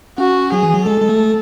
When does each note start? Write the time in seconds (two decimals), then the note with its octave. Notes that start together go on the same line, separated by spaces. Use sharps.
0.18 C#4 F#4
0.52 F#3 G#4
0.63 E3
0.74 F#3
0.86 G#3 A4
1.01 G#3
1.09 A3